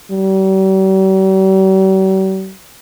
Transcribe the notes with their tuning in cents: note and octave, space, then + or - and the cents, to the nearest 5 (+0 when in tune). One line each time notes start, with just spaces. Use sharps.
G3 -45